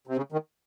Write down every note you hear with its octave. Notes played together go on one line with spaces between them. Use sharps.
C3
C#3
D#3